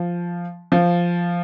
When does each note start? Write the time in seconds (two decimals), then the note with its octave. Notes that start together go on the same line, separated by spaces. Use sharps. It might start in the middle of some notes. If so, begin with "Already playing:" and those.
Already playing: F3
0.72 F3